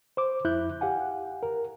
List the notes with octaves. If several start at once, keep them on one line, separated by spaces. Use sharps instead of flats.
C5 D6
F2 E4 F#6 G6
G4 F5 F#5 G#5
A#4